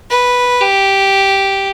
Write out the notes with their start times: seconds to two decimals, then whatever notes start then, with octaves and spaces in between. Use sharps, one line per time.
0.10 B4
0.61 G4